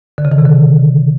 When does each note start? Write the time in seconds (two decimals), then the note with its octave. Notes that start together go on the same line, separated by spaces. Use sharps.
0.18 D3
0.25 C#3
0.32 D#3
0.38 C3
0.45 D3